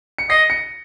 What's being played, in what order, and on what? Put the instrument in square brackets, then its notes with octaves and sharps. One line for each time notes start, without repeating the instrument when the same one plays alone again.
[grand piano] C#7
[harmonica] D#5 [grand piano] A#6 C7
[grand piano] C#7